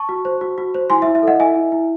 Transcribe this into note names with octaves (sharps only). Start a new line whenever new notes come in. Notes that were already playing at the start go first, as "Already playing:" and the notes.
Already playing: A5 C#6
F#4
C5
F#4
F#4
C5
E4 G#5 C6
E5
E4
E5
A4 D#5 F#5
E4 E5 G#5
E4
E4